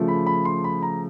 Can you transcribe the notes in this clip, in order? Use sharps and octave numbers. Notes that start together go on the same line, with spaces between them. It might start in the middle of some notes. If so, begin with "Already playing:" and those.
Already playing: C#3 F3 A3
B5
B5
C6
B5
A#5